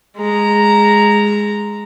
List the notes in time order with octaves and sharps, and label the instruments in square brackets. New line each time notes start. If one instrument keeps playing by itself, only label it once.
[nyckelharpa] G#3 A#5